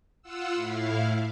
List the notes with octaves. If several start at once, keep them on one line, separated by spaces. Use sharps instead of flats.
F4 F#5 E6
A2 E4 F5